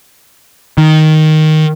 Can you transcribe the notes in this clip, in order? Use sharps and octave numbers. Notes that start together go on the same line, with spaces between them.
D#3